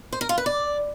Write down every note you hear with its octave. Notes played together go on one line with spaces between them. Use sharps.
C5
A#4
F4
B4
D5